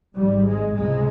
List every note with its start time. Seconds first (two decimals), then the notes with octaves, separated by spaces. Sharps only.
0.15 G#1 G#2 G3
0.45 G#3
0.74 C#2 C3 G#3